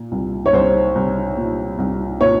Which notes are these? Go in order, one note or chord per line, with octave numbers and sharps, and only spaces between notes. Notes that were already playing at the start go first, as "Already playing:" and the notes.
Already playing: A#2
C2
C#5
C2 C5
C2
A#2
C2
A#2 C#5